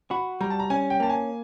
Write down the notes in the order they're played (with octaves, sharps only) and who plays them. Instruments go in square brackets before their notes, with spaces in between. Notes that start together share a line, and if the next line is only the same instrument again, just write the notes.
[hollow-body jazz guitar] F#4 [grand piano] B5
[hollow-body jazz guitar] G3 [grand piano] A#5
[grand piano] A5
A#5
[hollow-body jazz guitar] C#4 [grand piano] G#5
[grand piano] G5
[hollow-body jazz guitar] A#3 [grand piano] A5
[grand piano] G#5